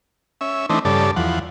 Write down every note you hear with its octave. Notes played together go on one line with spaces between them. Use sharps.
C#4 E5
E3 A3 C4 D4 D#4
G2 C#3 A4 D5
E2 F3 F#5